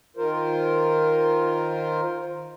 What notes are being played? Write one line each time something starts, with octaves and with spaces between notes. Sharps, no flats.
D#3 F4 A#4 C5